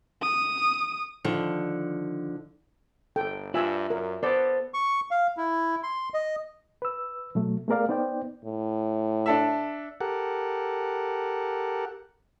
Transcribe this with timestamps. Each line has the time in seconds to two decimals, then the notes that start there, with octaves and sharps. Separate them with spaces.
0.22 D#6
1.24 D3 D#3 F3
3.16 G1 A4 G5
3.54 G2 F4 D5 E5 G#5 E6
3.90 F#2 A#4
4.23 B3 A4 C5 D5
4.74 C#6
5.11 F5
5.37 E4
5.83 C6
6.14 D#5
6.82 B4 E6
7.35 B2 F#3 A3
7.68 A3 B3 G#4 A#4 D5 F5
7.89 B3 D#4 C5 D5 G5
8.45 A2
9.26 D4 A4 E5
10.01 G4 A4 A#4 F#5